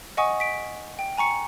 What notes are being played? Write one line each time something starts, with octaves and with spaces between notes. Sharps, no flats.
D#5 F#5 G#5 C#6 D#6
B6 D7
G5
G#5 A#5 C#6 C#7